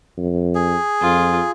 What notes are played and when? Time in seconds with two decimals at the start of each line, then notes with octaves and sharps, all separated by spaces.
0.17 F2
0.55 G#4
1.01 F2 F4